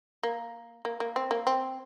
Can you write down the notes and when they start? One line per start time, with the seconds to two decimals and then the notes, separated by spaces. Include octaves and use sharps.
0.23 A#3
0.85 A#3
1.00 A#3
1.16 C4
1.31 A#3
1.47 C4